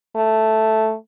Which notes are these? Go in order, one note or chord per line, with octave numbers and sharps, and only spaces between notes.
A3